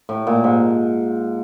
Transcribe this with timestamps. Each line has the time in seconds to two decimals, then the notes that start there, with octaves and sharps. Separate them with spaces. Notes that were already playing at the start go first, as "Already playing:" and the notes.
0.09 A2
0.27 A#2
0.44 G#2